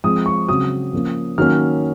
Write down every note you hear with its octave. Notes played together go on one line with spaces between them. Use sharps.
F3 G#3 C4 D#6
C#6
C#3 F#3 C4 D#6
F3 A#3 C#4
D#3 F#3 A#3 C#4 F6